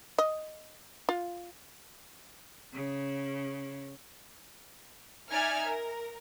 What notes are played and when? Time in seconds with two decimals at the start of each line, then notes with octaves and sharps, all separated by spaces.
0.18 D#5
1.09 F4
2.73 C#3
5.31 D#4 D5 E5 G#5 F6 G#6
5.65 A#4